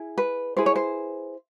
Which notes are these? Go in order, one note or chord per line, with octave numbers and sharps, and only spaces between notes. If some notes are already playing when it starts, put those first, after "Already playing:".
Already playing: E4 G#4
B4
E4 G#4 B4 C5
C#5
C5